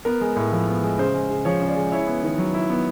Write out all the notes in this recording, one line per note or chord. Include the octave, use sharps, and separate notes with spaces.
B3 A#4
G#3
A2
F3
B3
G#3
C#3 C5
G#3
C#3
F3 C#5
C#3
D5
G#3
E4 C#5
B3
D#3
F#3
E4
B3